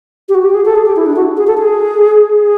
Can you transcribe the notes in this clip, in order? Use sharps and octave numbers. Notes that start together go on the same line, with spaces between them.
G4
F#4
G4
G#4
A4
G#4
G4
E4
D4
F#4
G#4
A4
G#4
G#4